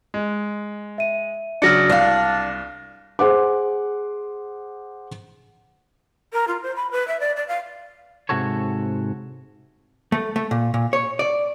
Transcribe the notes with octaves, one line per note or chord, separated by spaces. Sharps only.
G#3
E5 D#7
C#3 F#3 D4 F6 A#6 C#7
C2 D4 F5
G#4 C5 F#5 D6
A#4
F4
C5
B5
B4
E5
D5
D5
F5
G#2 C3 F#4 A4 C#5
A3
A3
A#2
A#2
C#5
D5